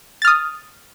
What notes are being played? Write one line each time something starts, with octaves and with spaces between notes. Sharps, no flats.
D#6 F6 A6